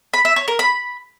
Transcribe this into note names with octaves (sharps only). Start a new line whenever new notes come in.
B5
E5
C#5
A#4
B5